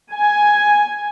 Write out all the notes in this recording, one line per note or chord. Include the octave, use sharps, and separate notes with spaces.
G#5